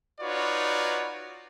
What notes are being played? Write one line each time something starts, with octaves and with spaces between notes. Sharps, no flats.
D#4 F4 F#4 B4 C#5 D5